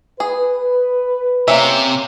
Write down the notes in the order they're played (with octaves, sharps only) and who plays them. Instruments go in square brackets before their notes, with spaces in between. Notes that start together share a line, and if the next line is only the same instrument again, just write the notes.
[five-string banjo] G#4 [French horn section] B4
[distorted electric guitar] C3 [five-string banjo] A#3 C#4 E5